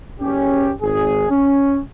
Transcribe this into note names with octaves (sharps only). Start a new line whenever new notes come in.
F#1 C#4 G4
G#1 G#4
C#4